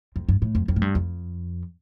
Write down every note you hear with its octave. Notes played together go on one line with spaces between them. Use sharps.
F2
G2
A2
F2
F2
A2
G2
F2